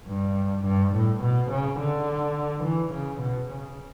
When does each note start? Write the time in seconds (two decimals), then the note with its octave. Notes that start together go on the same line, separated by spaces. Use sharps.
0.08 G2
0.65 G2
0.94 A2
1.23 B2
1.50 C#3
1.79 D3
2.64 E3
2.92 C#3
3.21 B2
3.49 C#3